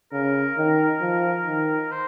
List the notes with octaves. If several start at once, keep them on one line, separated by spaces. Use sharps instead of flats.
C#3 A#4
D#3
F3
D#3
C5